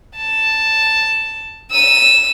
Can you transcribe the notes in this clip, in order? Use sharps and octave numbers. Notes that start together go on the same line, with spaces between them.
A5
E6 D#7